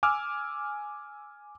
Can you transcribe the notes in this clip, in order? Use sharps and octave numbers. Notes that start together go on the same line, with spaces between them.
G#5 D6 E6 F6